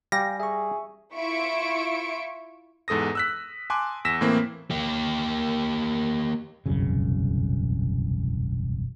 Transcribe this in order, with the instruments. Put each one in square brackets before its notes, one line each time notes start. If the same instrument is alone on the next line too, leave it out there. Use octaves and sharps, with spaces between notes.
[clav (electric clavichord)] G3 [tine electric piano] F5 G5 G#5 [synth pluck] A#6
[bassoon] G#4 [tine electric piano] E5 C#6
[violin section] E4 F4 E5 C#6 D7
[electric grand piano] E2 G#2 A4 D#6 A#6
E6 F#6 B6
G#5 A5 C6 D6 F#6
E2 E6 A#6 B6 E7
A2 E3 A#3 C4
[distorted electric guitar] A#3 G4
[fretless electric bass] E1 C2 F#2 C#3